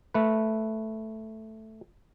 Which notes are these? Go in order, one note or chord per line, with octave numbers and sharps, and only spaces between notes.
A3 B4